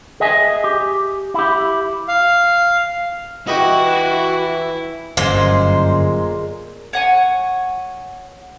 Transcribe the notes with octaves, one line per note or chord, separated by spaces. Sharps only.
G#4 D#5 E5 G#5
G4
E4 G4
F5
E3 E4 F#4 G4 B4 D#5
G1 F#2 A#2 G#3 C5
C#5 F#5 G#5